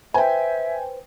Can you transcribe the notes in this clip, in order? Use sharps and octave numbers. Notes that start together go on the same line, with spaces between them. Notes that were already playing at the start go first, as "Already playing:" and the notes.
B4 C5 E5 G5 G#5